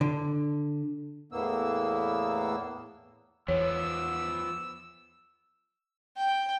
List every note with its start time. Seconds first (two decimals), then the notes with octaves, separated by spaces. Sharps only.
0.01 D3
1.32 E2 A2 A#3 B3 E6
3.48 E2 F3 B3 C#5 E6
6.17 G5